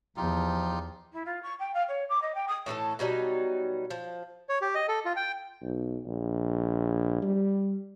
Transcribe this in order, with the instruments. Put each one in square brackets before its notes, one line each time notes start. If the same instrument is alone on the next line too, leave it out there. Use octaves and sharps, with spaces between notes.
[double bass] E2 [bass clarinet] F3 [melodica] D#4 F4 G4
[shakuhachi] E4
F4
C#6
G5
F5
C#5
D6
D#5
G5
D#6
[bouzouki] A2 E3 E4 A4
B2 F#3 G3 D#4
F3
[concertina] C#5
G4
D#5
A4
F4
G5
[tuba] B1
A#1
G3